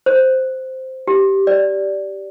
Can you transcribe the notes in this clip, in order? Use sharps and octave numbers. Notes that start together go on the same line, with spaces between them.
C5
G4
D5